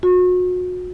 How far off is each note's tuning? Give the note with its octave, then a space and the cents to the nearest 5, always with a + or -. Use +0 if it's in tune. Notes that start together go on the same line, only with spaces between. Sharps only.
F#4 -35